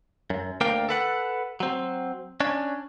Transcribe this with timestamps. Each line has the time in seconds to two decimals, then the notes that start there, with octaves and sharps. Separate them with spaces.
0.30 F#2
0.61 D2 A#3 D4 A#4 F5 G5
0.89 A4 B4 F#5
1.60 F#3 C4
2.40 C#4 D4